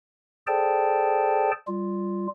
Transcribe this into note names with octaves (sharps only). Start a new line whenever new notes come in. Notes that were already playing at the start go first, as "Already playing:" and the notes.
G#4 A4 C5 D5 G5 A5
G3 F4